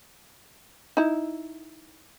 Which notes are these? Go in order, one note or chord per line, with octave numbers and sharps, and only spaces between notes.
D#4 E4